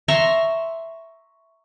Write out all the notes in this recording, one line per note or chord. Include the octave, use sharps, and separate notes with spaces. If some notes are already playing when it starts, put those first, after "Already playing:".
E5 A#5 C6 C#6